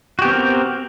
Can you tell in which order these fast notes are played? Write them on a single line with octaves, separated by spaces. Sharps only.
F#4 G4 B3 C4 A#4